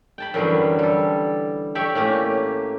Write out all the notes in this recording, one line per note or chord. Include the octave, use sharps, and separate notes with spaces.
G5 A5 B5
F#2 D3 E3 F#3 G3
G3 A4
G4 A4 C#5 D5 E5 G5
A2 A#3 C#4 G4